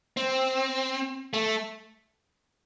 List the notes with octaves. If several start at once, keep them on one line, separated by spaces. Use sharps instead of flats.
C4
A3